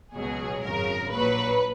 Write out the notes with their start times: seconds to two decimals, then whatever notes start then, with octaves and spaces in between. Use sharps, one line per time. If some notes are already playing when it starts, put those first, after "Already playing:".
0.14 C#2 B2 F#3 G#4
0.62 G#1 F#2 C#3 A#4
1.11 A#1 A#2 F#3 B4